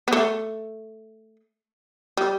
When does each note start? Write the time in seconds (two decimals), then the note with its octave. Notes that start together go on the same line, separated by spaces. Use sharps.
0.08 B3
0.13 A3
2.17 G3